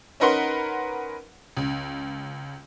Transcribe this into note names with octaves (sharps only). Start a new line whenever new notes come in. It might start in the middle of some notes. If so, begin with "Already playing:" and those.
C#4 D#4 A#4 B4 F#5 C6
C#2